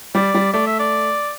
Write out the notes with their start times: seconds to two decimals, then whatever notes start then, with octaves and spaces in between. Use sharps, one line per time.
0.15 G3 D5
0.34 G3
0.53 A3 D5
0.67 E5
0.80 D5